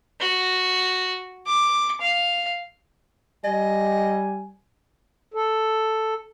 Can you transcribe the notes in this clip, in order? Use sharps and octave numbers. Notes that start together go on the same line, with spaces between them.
F#4
D6
F5
G3 D#5 G#5
A4